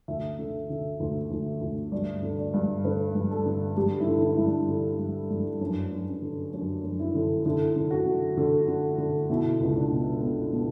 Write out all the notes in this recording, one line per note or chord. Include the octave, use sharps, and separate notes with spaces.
D2 E5
D3
D3
D2
D2
D2
G2 D5
D3
D5
G2
D3 B4
G2
A4
D3
G2 G4
E4
D3
E4
G2 E4
D4
D3
G2
G2
F#2 D4
F#2
C#4
D3
F#2 D4
F#2
E4
D3
D3 E4
D3
F#4
D3
D3
D3
D3
B2 E4
C#2
D4
B2
B2
B2